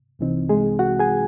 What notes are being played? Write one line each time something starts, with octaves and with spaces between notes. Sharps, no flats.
C2 C3 E3 C4 D#4
G#3 G#4
F#4 F#5
G#4 G#5